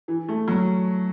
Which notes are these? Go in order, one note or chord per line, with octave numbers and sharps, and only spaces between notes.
E3
A3
F#3